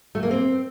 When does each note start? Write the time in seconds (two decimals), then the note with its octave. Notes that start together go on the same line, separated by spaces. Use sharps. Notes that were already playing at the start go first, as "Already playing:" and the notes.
0.15 A3
0.23 A#3
0.31 C4